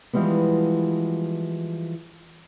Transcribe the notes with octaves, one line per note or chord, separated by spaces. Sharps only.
E3 F3 G3 G#3 B3